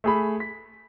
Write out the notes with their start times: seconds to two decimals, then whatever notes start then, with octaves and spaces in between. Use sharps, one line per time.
0.04 A3 G#4 B5
0.40 B6